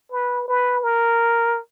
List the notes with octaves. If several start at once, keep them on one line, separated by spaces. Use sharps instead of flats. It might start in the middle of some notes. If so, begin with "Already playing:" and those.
B4
B4
A#4